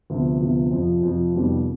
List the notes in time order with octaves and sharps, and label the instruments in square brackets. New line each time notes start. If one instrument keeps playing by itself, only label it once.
[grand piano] D2 C3 F3 B3
D2 C3 F3 B3
F2 C3 F3
F2 C3 F3
F1 F2 D#3 G3 B3